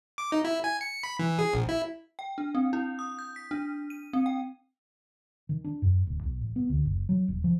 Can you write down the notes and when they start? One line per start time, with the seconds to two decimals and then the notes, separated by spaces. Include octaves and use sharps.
0.18 D6
0.32 D#4
0.45 E4
0.64 G#5
0.81 C#7
1.03 B5
1.19 E3
1.39 G#4
1.54 A#1
1.69 E4
2.19 G5
2.38 D4
2.55 C4
2.73 E4
2.99 D#6
3.19 G6
3.36 B6
3.51 D4
3.90 D#7
4.13 C4
4.26 G5
5.49 D#3
5.64 D4
5.82 F#2
6.07 D1
6.23 B1
6.41 A1
6.56 B3
6.70 D2
6.85 F#1
7.09 F#3
7.28 D#1
7.44 F3